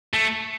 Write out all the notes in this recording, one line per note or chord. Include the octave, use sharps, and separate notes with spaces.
A3